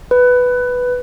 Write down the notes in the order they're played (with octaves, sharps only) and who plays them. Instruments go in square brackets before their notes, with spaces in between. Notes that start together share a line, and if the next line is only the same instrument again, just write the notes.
[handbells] B4